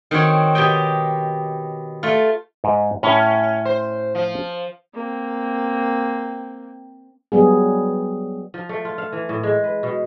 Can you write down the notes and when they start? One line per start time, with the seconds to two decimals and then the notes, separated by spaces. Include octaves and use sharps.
0.11 D#3 C4 F#4 C#5
0.55 B2 G4 D#5 G5
2.03 A3 F4
2.64 G#2 D#5
3.03 A2 C#4 G#5
3.65 C5
4.15 F3
4.94 A#3 C4
7.32 F#3 G3 B3 G#4
8.54 F3
8.69 A3
8.85 F4
8.98 F5
9.12 E3
9.29 A2
9.43 G#3
9.64 B4
9.83 B2